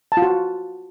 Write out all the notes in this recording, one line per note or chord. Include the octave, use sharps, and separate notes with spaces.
A5
F4
F#4